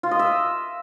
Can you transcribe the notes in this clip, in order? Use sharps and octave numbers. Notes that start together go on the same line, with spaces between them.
F4
D#5
E5